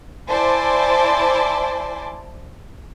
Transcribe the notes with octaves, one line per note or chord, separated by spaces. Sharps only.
E4 C5 D5 G#5 A5